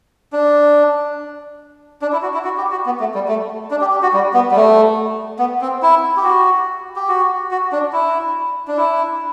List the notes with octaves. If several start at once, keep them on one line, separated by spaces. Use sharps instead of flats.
D4
D4
E4
F#4
E4
F#4
G4
F#4
B3
A3
G3
A3
D4
G4
G4
F#4
G3
B3
G3
A3
B3
C4
E4
G4
F#4
G4
F#4
F#4
D4
E4
D4
E4